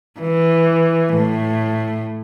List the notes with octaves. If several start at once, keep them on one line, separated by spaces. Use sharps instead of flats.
E3
A2